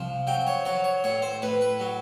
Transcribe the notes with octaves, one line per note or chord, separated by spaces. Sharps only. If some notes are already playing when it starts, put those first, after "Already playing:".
Already playing: C2 F3
F#3 G5
C#5
F#3 C#5
C#5
A2 C#5
C5
A2 B4
B4
F#3